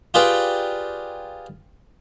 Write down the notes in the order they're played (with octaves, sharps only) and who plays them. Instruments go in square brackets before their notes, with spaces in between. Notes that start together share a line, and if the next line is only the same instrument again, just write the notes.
[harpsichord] F4 G4 G#4 B4 D5